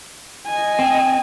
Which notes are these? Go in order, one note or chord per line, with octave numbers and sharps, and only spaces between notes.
D#5 G#5
C4